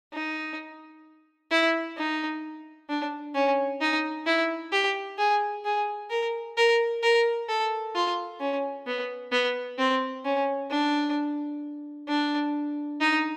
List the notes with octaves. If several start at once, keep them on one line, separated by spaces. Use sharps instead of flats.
D#4
E4
D#4
D4
C#4
D#4
E4
G4
G#4
G#4
A#4
A#4
A#4
A4
F4
C#4
B3
B3
C4
C#4
D4
D4
D#4